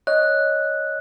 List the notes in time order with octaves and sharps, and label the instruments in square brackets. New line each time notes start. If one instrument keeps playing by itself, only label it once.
[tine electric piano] C#5 D#5 [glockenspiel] F#6